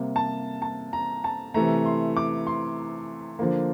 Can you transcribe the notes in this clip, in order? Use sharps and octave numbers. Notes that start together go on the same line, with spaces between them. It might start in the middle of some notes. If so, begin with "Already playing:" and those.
Already playing: C3 G3 A#3
A5
A5
A#5
A5
C3 E3 A3 A#5
C6
D6
C6
D3 F3 A#3